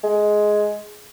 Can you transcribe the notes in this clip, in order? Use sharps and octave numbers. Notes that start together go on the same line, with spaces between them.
G#3